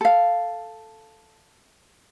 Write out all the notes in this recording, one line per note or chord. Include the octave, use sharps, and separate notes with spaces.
A4 F5